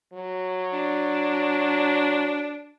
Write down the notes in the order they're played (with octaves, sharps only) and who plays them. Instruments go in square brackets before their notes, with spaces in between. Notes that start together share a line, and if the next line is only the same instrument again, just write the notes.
[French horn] F#3
[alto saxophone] D4